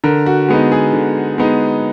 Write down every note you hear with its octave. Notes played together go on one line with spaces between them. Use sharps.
D3 A#4
F#4
G#3 B3 D#4 G#4
G#4
D3
G#3 B3 D#4